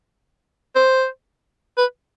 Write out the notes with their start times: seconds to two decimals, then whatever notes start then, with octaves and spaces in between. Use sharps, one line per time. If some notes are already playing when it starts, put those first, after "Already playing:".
0.76 C5
1.77 B4